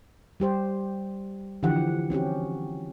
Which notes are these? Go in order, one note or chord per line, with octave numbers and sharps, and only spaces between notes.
G3 G4 C5
D3 E3 F3 G4 F#5
C4 C#4 F#4 G4